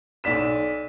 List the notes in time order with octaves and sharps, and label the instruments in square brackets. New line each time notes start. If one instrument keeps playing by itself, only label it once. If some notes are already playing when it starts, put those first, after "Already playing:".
[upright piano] B1 D5 B6 E7